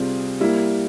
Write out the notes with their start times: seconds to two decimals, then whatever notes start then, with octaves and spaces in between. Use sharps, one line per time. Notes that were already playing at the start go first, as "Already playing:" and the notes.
Already playing: C3 G3 C4 F4 G#4
0.40 G3 A#3 E4